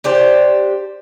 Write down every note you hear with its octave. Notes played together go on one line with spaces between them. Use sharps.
D4 G4 C5